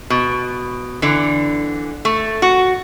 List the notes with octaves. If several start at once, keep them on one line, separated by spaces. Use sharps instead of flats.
B2
D3 E3
A3
F#4